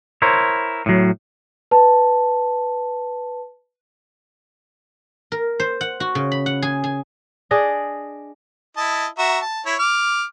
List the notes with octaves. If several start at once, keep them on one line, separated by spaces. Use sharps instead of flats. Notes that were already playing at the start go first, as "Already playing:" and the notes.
E4 A#4 C5 C#5
A2 F#3
B4 A5
A#4
C5
F#5
F#4
C#3
B5
F#5
G#4
G#4
D4 G#4 D5 D#5
E4 D#5 A5
F#4 E5 A#5
A5
E4 C#5
D6 F6